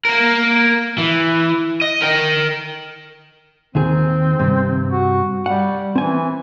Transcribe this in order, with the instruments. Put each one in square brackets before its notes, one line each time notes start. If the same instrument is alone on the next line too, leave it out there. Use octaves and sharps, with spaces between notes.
[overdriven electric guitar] A#3 A#4
E3
D#5
A#4 G5
[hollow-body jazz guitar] D#2 D#3 G#4 [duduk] C4
[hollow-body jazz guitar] G2 C3
[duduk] F#4
[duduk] G3 [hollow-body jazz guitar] F#5
[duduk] E3 [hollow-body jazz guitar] C4 G#5